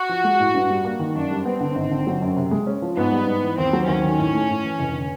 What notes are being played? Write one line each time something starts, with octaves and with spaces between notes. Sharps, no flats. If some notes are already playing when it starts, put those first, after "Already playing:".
Already playing: F#4
F3
G#3
A2
G2
G3
A#3
D#3
F#2 D4
G3
B3 C4
D3
G#1
D3
F#3
F#2
C3
G#3
C#4
F3
G#2 B3
G3
G#2
E3
D#2 C4
F#3
D#2 C#4
D#3
A2
A3
A2
E3
F1
D3